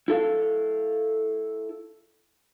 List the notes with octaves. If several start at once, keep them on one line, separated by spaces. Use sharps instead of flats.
E4 A4 F5